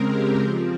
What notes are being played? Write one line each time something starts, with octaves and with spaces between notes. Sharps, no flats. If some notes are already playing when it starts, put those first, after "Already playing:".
Already playing: C#3 G#3 C4 A#4
G4
F3 C4